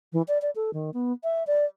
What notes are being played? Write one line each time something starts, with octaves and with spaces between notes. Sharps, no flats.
E3
D5
D5
A4
D#3
B3
E5
D5